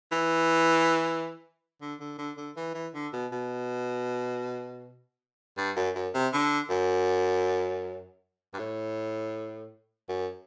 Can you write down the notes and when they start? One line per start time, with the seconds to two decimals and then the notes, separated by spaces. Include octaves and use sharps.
0.12 E3
1.81 D3
2.00 D3
2.18 D3
2.37 D3
2.56 E3
2.74 E3
2.94 D3
3.13 B2
3.32 B2
5.58 G2
5.76 F#2
5.95 F#2
6.14 C3
6.33 D3
6.70 F#2
8.53 G2
8.59 A2
10.09 F#2